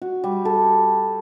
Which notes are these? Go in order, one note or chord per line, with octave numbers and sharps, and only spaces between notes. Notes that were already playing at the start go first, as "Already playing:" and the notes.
F#4
G3
A4